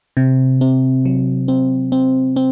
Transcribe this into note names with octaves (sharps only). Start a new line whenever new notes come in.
C3
C4
F#3
C4
C4
C4